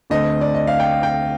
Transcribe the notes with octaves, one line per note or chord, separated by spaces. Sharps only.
D2 D3 A3 C4 D#5
D5
D#5
F5
G5
G5